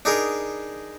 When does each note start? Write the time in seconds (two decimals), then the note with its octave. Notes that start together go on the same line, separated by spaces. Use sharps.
0.05 D4 D#4 G#4 A#4